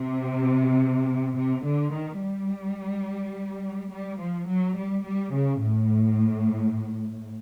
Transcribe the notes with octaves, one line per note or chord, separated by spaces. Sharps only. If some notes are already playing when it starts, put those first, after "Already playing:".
Already playing: C3
C3
D3
D#3
G3
G3
F3
F#3
G3
G3
C#3
A2